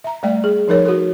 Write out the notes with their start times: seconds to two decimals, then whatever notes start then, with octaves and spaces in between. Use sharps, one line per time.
0.04 E5 A#5
0.23 G3 A3 D5 G5
0.44 G#4
0.68 F3 D#4 A#4 C#5
0.86 F#4 A4